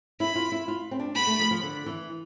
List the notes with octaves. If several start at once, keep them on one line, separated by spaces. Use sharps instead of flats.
E4 B5
F4
E4
F4
C4
D4
B3 B5
A3
F3
F3
D3
E3